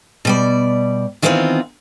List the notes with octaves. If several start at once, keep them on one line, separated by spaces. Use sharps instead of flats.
B2 G3 D5
D#3 E3 G3 B3 C4 F4